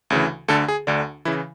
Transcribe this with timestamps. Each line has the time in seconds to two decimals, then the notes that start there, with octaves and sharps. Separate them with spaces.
0.10 D2 C#3 E3
0.48 D2 D3 A4
0.68 G#4
0.87 D2 D3 D4
1.25 C#3 E3 E4